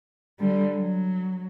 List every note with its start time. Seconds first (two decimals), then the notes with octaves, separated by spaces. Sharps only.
0.39 D3 G3
0.76 F#3